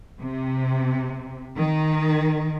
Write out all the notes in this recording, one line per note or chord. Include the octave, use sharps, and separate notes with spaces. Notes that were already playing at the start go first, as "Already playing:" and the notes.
C3
D#3